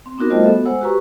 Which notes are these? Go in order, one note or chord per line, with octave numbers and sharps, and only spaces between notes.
C4
B3 D4 D#4 F#4 A#4
G3 A3 F4 C5 D#5
B3 F#4 A4 E5
G#3 C5 F#5 E6
F#4 G4 B4 A#5 C#6